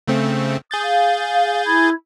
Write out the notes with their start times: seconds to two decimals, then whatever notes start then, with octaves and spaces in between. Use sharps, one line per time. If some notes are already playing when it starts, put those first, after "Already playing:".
0.07 C#3 A3 C4
0.71 G#4 D#6 G6 A6
0.83 F5
1.66 E4 B5 G#6